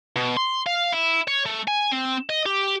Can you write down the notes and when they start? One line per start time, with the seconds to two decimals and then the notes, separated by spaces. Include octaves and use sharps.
0.16 B2
0.37 C6
0.66 F5
0.92 E4
1.28 C#5
1.46 A3
1.68 G#5
1.92 C4
2.29 D#5
2.46 G4